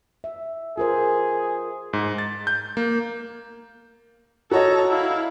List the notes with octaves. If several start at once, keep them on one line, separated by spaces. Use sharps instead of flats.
E5
F4 G#4 A#4 C5
G#2
A6
G6
A#3
F#4 A4 C#5 D#5 A#5
E4 F5